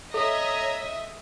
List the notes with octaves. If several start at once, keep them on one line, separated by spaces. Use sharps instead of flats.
A4 C#5 D#5 E5 A#5